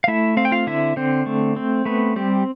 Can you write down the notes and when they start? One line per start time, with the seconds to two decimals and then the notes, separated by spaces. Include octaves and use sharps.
0.04 F5
0.08 A3 E4 E5
0.37 C4 F5
0.45 G5
0.52 F4 F5
0.67 D3 E4 E5
0.96 D3 C4 C5
1.26 A3
1.56 C4
1.85 A3 B3 B4
2.16 G3 C4 G4